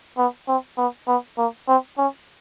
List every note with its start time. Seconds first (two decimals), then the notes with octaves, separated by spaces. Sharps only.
0.18 B3
0.48 C4
0.78 B3
1.08 B3
1.38 A#3
1.68 C4
1.98 C#4